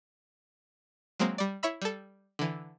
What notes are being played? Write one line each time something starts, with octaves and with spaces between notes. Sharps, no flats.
F#3 G#3 A#3 C4
G3 D5
E4 C#5 E5 B5 E6
G3 A4
D3 E3